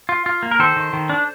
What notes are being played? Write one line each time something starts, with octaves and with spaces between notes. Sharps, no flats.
F4
F4
A#3
A#4
D#3 A4 C5
D#3
D#3
D4